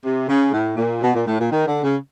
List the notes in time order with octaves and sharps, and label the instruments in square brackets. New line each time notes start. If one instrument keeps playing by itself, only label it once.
[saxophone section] C3
C#3
A2
A#2
B2
A#2
A2
A#2
D#3
D3
C#3